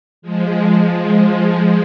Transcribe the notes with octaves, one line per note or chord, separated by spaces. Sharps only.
F3 G#3
F3 G#3